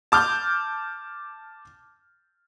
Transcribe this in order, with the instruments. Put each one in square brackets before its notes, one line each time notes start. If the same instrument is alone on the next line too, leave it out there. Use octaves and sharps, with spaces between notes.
[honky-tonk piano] A5 D6 F6 G6